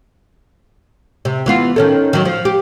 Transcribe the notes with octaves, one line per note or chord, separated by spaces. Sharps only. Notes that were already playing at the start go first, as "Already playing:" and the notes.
C3
E3 B3 F4
D#3 C#4 A4
D#3 F#3
F3
G4